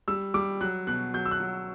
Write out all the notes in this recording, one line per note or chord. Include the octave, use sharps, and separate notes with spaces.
G3 E6
G3 D6
F#3 F#6
B2 F#6
F#3 G6
E6
F#6
F#3